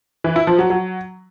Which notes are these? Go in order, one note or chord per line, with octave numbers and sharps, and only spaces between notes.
E3
E4
F3
F#3
F#3